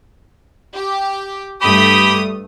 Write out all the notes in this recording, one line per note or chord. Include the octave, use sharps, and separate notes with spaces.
G4
G2 A3 G4 B5 D#6